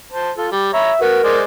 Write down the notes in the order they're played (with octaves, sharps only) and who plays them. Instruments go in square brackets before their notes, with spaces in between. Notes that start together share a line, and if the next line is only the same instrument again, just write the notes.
[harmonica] C5 A5
F4 A4
G3
[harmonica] C#5 A#5 B5 [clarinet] E5
[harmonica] F#4 B4 [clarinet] A#4
[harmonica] G#3 C5 D5